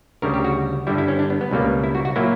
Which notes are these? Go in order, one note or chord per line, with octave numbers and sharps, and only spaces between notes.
D2 C#3 G3 A#4
G4
F#4
G2 D3 G3 E4
E4
C#4
D4
B3
B3
C#2 B2 G3 A#3
E4
F#4
F#4
A#2 F#3 A#3 E4